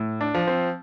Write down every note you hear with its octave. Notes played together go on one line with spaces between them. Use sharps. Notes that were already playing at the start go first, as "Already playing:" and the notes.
Already playing: A2
D4
F3
C4